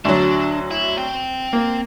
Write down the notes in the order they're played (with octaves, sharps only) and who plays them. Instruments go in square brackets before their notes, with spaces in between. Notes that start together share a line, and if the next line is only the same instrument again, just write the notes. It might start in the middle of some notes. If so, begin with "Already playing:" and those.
[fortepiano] D2 F#3 [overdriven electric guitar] D4
[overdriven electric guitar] E4
C4 G5
[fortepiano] A#3